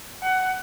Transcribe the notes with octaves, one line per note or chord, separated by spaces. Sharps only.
F#5